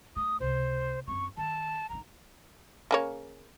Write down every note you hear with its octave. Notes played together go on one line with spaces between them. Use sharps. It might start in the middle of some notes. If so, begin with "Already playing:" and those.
A3 D#6
C#2 C3 C5
F#2 C4 C#6
D#3 A5
A1 D#4 A#5
C#3 A#3 C#5